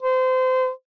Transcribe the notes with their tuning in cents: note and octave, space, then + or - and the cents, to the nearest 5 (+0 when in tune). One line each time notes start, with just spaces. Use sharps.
C5 -25